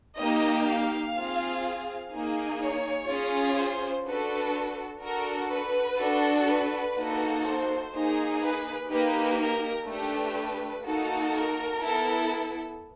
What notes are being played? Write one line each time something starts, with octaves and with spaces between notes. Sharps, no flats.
A#3 D#4 G4 D#5
F5
C4 F4 G#4
A#3 D#4 G#4
C#5
C#4 F4 G#4
C5
D4 F#4 A4 B4
D4 F#4 A4 A#4
B4
D4 F#4 A4
B4
A#3 D#4 F#4 A4
C5
A#3 D#4 G#4
B4
A#3 D#4 G4 B4
A#4
A3 D4 G4 B4
A#3 D#4 F#4 A4
A#4
B3 E4 A4